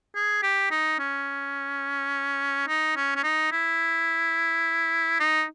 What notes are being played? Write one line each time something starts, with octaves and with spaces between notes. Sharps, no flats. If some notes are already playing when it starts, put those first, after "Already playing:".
G#4
G4
D#4
C#4
D#4
C#4
C#4
D#4
E4
D#4